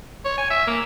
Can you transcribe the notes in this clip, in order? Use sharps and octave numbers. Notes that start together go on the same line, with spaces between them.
C#5
G#5
E5
A#3